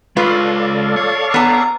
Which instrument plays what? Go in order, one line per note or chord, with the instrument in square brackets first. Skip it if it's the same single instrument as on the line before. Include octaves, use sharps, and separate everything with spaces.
[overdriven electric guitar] G#3 C#5 [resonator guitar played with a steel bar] F4 B4 [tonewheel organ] A4 D5 F5
[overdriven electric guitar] C#5
[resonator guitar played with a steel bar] B3 A5 [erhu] A#5